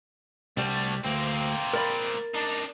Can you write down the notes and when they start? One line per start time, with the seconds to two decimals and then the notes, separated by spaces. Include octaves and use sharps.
0.57 C2 G3 A3 F#4
1.05 D2 A#3 C4
1.73 A#4 D5 B5
2.34 D4 D#4